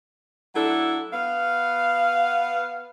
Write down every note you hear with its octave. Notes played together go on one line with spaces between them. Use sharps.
F#3 A3 D4 E4 A4
B3 F5